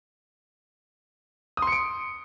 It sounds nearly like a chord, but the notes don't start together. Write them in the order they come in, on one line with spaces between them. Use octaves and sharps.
D#6 C6 C#7 D7